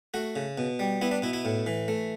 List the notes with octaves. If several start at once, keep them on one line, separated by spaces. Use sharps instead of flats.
A3 F#4
C#3
B2
G3
B3 E4
D4
B2 E4
E4
A2
E3
A3